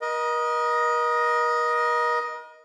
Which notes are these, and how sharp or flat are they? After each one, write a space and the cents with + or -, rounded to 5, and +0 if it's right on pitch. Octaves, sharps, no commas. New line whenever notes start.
A#4 +40 D#5 +0